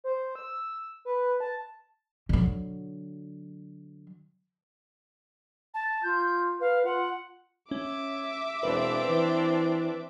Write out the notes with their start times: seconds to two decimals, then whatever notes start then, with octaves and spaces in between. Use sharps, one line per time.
0.04 C5
0.35 E6
1.05 B4
1.40 A5
2.29 D3 F#3
5.74 A5
6.03 F4 G6
6.61 B4 F5
6.85 F4 F#5
7.71 C#4 E5 D6
8.63 E1 C4 D4 B4
9.09 E3